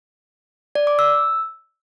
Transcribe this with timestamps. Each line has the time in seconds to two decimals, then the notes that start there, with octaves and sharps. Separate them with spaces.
0.75 D5
0.87 D6
0.99 E6